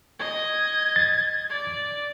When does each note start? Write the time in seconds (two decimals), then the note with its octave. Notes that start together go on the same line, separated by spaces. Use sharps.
0.19 D#5 G#6
0.96 A6
1.50 D5